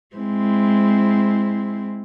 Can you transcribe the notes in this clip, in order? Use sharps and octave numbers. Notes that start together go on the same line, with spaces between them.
G#3 C4 E4